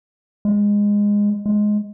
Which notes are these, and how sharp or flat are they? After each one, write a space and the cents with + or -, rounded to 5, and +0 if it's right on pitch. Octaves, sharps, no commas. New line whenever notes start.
G#3 -15
G#3 +10